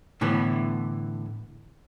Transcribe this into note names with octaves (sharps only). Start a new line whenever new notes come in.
A2 D3 E3 B3